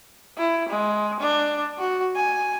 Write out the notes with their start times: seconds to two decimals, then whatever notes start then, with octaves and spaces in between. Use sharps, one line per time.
0.37 E4
0.69 G#3
1.20 D4
1.78 F#4
2.15 G#5